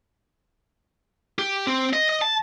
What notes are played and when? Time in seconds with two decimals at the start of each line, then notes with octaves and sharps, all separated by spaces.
1.39 G4
1.67 C4
1.93 D#5
2.09 D#5
2.21 A5